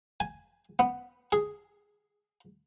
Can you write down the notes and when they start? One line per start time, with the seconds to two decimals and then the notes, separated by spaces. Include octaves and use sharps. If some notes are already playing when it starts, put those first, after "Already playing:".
0.20 G#5
0.79 B3
1.32 G#4